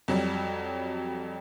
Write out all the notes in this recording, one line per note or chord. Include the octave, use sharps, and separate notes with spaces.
F2 F#3 G3